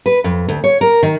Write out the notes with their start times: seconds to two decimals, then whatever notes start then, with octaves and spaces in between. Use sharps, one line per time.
0.06 B4
0.24 F2
0.48 D2
0.64 C#5
0.81 A#4
1.03 D#3